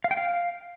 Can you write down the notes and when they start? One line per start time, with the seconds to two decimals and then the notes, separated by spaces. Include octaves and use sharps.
0.04 F5
0.11 G5
0.17 F5